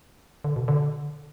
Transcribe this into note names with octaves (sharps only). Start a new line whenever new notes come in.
D3
B2
D3